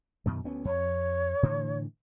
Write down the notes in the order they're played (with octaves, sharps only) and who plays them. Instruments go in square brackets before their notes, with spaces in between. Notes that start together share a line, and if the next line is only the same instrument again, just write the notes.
[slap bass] F#2 B2 D#3
D2 B3 C#4
[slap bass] F2 [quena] C#5
[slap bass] A2 D3 E3